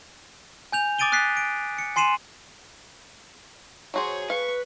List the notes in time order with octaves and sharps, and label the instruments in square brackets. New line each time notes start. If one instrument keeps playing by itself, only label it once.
[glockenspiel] G#5 G6 F7
D6 D#6 A6 D7 D#7 G7
D#6 F#6 A6 B6 C7
D7
C#7
G#5 C6 C7 D#7 E7 F#7
[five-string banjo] F#3 F#4 C5 [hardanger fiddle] G#4 C#5
[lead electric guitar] B4 [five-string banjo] F5 [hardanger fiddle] C#6